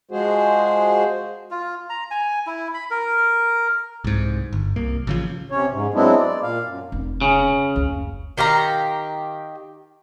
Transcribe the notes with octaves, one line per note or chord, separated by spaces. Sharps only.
F3 G#3 F#4 G#4 C5
F4
A#5
G#5
E4
B5
A#4
C2 G#2
G1
C2 A#3
A1 C#3 F3
C3 C#4 C#5
G#2
F#3 G#3 B3 C4 D4 E4
D5
A#2 F5
F#2
F1
C#3
F#1 D2
D#3 G4 F5 A#5